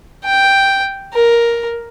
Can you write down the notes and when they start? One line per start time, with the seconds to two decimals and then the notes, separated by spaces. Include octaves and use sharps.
0.25 G5
1.13 A#4